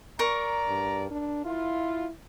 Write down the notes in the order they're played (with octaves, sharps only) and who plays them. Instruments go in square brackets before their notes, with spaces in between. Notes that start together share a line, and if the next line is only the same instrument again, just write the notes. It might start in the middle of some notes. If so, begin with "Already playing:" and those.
[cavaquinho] A#4 C#6 [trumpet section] D5 A#5
[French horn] G2
D4
[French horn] E4 [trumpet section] F4